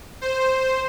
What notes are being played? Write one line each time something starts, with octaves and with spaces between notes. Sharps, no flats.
C5